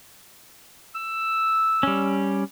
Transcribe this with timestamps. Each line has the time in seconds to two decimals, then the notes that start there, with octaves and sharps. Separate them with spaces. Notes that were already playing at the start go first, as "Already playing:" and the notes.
0.95 E6
1.83 G3 C#4